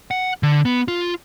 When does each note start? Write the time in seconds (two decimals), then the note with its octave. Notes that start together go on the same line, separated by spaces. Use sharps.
0.11 F#5
0.43 D3
0.65 B3
0.88 F4